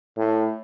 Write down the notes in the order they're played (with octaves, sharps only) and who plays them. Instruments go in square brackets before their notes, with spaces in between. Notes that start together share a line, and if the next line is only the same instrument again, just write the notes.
[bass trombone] A2